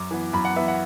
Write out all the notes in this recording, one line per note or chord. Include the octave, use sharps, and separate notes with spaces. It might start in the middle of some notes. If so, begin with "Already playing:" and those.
Already playing: F#2 D6
E3 B3
F#2 B5
F#5
E3 B3 E5
F#5